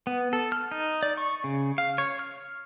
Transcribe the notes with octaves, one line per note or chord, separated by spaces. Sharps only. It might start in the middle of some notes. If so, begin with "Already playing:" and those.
B3
A4
F6
D#4
D5
C#6
C#3
F5
C#5
F6